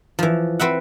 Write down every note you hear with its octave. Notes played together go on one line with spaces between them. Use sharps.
E3 F3
C4 B4 E5 F#5